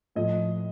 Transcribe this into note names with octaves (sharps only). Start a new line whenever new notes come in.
A2 F3 D#5